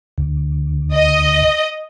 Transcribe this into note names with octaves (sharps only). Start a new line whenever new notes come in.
D2
D#5